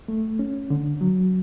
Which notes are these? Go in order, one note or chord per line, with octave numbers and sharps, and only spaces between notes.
A3
C#4
D3
F#3